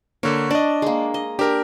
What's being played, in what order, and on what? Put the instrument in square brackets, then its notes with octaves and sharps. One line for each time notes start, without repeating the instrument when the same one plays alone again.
[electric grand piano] D3 A#3 [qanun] C#5
[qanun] D4 [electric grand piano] D5 D#5
[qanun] G#3 A#3
D#5
[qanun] D4 [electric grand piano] G4 A#4